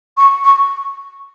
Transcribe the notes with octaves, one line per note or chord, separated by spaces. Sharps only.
C#6
C#6